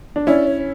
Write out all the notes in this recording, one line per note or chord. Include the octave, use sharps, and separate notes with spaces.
D4
C#4 E4 D5
C#5